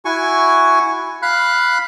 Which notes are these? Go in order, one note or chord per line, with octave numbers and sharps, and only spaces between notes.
E4 F#4 G#5 C#6
F5 B5 F#6